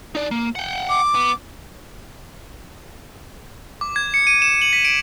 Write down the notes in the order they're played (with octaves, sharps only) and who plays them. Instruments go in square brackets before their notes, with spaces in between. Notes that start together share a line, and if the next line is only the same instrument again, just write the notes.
[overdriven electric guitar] D#4 D5
A#3
F#5 G5
[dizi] D6
[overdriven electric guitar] B3
[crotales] D6
G#6
C#7
D#7
E7
F#7
B6
D7